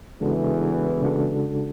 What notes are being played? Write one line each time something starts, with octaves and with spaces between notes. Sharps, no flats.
E2 C#3 E3 G#3 D4 F#4 A4
C#3 G#3 D4 F#4 A4